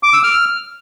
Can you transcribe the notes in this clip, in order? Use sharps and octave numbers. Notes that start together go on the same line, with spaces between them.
D6
E6
F6